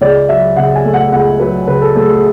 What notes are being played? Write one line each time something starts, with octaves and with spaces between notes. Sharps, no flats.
C#2 D5
F#3 E5
C#3 F#5
G#5
A3
F#5
C#2 F#5
F#3 B4
C#3 B4
A4
A3 G#4
G#4